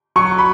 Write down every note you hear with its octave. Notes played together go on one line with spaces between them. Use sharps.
F#3 C#6
B5